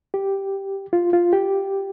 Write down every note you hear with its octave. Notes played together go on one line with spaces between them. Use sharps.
G4
F4
F4
G4